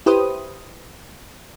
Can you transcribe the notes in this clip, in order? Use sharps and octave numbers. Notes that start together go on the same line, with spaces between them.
E4 G4 B4 C5 D#6